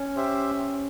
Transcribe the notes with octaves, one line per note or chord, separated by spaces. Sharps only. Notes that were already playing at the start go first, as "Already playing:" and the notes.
Already playing: C#4
G4 C5 E5